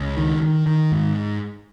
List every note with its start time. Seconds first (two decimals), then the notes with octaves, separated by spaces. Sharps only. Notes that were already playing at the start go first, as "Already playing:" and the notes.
Already playing: C#2
0.17 D#3
0.42 D#3
0.66 D#3
0.92 G#2